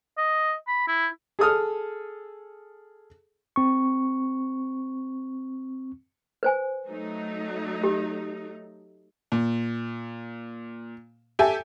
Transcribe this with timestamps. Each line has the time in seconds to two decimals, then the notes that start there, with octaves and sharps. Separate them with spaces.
0.18 D#5
0.68 B5
0.88 E4
1.39 G#4 A4 D#6 F6
3.56 C4 C#6
6.43 B4 C5 G#5
6.88 F#3 A3 D#4
7.83 G4
9.32 A#2
11.39 G4 A4 E5 G#5